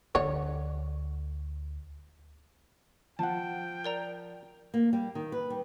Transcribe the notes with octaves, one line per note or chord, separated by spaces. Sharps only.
D2 D3 C#5
F3 F#5 G5 A5
A#4 D5 A#5
A#3
G3
D#3
B4
G3